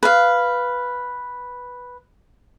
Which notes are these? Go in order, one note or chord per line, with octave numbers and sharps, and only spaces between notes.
B4 F5